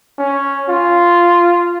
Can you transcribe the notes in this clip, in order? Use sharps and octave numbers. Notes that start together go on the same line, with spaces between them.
C#4
F4